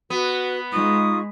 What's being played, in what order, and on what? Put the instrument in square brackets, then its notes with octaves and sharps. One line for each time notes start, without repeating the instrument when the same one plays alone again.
[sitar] B3 [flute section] F#4 B4
[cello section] G#3 [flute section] D#4 F4 C#6 [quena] D#6